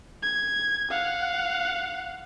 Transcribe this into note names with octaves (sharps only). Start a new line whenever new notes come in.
G#6
F5 F#5